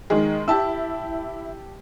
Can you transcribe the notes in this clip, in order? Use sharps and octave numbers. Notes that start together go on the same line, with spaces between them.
D#3 G#3 G#4
E4 G4 A5 E6